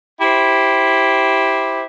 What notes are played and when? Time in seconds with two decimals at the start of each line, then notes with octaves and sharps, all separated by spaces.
0.21 E4 G4 C5